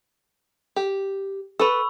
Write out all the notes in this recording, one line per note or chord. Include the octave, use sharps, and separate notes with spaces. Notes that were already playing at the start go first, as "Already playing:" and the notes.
G4
A4 B4 B5 C#6 E6